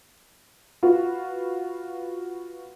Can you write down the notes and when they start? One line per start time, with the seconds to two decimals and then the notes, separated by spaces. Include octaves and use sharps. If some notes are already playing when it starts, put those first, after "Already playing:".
0.83 F4 F#4 B4